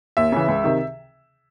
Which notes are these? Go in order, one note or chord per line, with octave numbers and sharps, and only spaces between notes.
D#2 E5
C#3 E3
C#2
C3 D#3